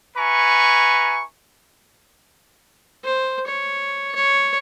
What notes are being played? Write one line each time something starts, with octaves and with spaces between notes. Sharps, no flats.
E4 B4 G#5 A#5 C#6
C5
C#5
C#5